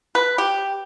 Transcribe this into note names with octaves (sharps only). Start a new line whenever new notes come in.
B4
G4